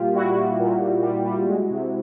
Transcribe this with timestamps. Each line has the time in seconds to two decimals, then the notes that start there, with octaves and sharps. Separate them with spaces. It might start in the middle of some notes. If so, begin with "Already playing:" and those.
Already playing: A#2 G3 F4 G4
0.15 G3 E4 F#4
0.36 G3
0.60 A#2
0.81 G3
1.03 G3
1.26 G3
1.47 G#3
1.71 C3